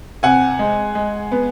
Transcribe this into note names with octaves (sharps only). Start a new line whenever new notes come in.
C3 F#5 G#5
G#3
G#3
B3